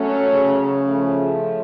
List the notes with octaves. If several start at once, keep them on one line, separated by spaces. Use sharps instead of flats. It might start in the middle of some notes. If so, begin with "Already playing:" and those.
Already playing: F#3 A3 C#4
C#3
A2 F3 A3